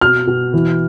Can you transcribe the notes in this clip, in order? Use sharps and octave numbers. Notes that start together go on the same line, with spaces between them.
B2 F6
B2
E3